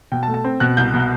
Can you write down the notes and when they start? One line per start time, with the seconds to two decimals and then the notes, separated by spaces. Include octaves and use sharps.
0.12 B2 G5
0.23 A5
0.28 A3
0.34 A5
0.44 C4
0.60 B2 F#6
0.77 C2 G6
0.94 B2